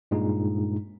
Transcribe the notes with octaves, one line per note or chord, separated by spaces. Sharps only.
G2 A#2 G#3 D#4